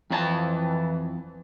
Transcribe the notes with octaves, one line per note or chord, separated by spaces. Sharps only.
F2 E3 D4 A5